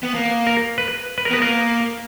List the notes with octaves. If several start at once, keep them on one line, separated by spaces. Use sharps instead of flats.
B3
A#3
A#4
B4
B4
A#4
B3 B4
A#3 A#4